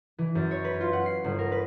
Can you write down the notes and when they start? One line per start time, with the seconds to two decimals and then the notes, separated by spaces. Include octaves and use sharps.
0.18 E3
0.35 F#2
0.51 C#5
0.64 B4
0.81 F4
0.93 F#5
1.06 C7
1.24 G1
1.39 A#4
1.52 B4